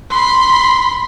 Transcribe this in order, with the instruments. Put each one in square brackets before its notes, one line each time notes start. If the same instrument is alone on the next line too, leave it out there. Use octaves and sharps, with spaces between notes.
[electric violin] B5 C6